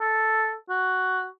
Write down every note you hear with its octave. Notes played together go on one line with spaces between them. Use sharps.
A4
F#4